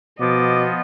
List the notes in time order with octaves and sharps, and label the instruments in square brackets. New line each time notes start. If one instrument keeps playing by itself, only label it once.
[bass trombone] B2 [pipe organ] F3 B3 [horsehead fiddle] D#5 [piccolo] D6